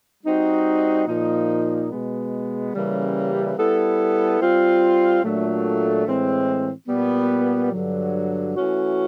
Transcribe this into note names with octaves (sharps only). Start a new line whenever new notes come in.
G3 C4 D#4 F#4
A#2 F3 A#3 D#4
B2 G#3 B3
C#3 E3 G3 A#3 C#4
G3 B3 E4 A4
G3 C4 F4
A#2 F#3 A3 D4 F4
A2 E3 G#3 C4
A#2 G3 B3
G2 D3 F#3
E3 A3 C#4 F#4